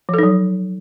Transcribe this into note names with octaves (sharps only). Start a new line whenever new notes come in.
F3 F#3 D#4 A4